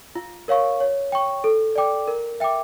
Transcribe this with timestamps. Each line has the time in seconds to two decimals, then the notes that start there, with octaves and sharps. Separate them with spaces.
0.16 F4
0.48 A#4 C#5 F5 C#6
0.80 C#5
1.12 G5 C#6
1.44 A4
1.75 D5 G5 D6
2.08 A#4
2.40 E5 G5 D6